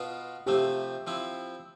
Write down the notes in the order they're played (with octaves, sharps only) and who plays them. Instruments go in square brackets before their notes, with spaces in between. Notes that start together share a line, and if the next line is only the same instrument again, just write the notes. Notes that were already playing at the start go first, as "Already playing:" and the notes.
Already playing: [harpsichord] B2 B3 F4 [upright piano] B4
[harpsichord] C3 F3 A3 C4 [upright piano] G4
[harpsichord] F3 C4 E4